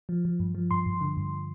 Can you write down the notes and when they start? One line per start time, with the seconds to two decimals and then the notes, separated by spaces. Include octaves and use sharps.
0.09 F3
0.25 F3
0.40 G2
0.55 F3
0.71 G2 C6
0.86 G2
1.01 D3
1.17 G2